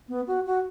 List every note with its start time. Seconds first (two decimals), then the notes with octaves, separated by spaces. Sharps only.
0.09 B3
0.27 F#4
0.46 F#4